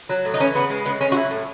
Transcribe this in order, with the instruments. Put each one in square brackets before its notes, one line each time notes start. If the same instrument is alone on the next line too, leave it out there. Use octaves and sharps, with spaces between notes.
[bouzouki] F#3
A2
D#4
E3 C#4
C#3 B3
G#3
C#3 B3
G#3 C#4
F#4
F#3 E4
A2